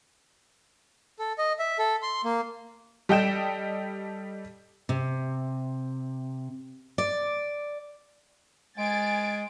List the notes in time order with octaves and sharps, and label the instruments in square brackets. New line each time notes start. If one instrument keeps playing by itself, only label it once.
[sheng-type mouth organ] A4
D#5
E5
A4
C6
A#3
[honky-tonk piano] G3 A4 D#5 G5 G6 E7
[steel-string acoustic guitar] C3
D5
[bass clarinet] G#3 [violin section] G#5 A6 D7